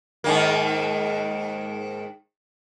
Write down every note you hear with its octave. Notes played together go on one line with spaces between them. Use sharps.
G#2 D#3 A#3